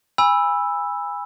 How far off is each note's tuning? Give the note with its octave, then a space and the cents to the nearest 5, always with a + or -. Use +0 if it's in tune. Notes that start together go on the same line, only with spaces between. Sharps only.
G#5 -25 B5 -5 E6 +0